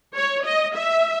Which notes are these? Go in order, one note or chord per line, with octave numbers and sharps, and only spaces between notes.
C#5
D#5
E5